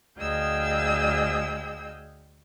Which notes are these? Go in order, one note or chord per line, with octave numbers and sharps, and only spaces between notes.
D2 G#4 D#5 F5 G5 E6